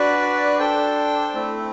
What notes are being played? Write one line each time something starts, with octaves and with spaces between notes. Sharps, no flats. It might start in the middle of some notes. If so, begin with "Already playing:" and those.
Already playing: D4 F#4 B4 D5
D4 A4 C5 G5
A3 C4 E4